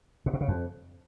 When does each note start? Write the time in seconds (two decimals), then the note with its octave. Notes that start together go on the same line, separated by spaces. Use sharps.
0.26 A#2
0.33 B2
0.41 C#3
0.48 F2